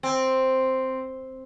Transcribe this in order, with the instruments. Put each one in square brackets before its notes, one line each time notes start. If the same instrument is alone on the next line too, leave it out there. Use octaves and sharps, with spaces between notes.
[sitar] C4